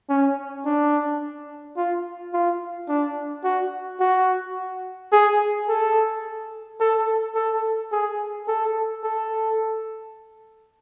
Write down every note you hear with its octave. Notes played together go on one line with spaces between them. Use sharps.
C#4
D4
F4
F4
D4
F#4
F#4
G#4
A4
A4
A4
G#4
A4
A4